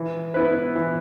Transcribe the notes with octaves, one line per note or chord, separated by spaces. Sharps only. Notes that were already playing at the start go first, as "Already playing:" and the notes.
Already playing: E3
B3 E4 B4
E3